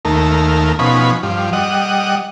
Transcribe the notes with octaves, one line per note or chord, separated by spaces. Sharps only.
D#2 A3 A#4
B2 F3 C#4 D#4 B5
G2 F3
G3 D#5 F#5